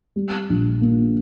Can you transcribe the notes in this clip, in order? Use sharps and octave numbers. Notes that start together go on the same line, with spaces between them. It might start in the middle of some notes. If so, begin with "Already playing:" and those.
G3
A#1
A#3